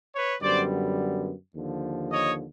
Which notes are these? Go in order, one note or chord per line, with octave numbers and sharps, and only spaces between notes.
B4 C#5
F#2 D3 G3 B3 C5 D5
D#2 D3 F3
C#5 D#5